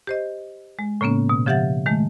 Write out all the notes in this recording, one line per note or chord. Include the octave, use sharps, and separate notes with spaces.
G4 C5 D#5
G#3
A2 C#3 A#3 B3 C#4
B2
C#3 F3 G4 E5 F#5 A6
D#3 G#3 A3